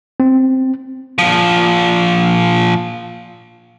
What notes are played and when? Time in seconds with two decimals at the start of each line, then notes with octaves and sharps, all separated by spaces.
0.20 C4
1.18 A#2 F3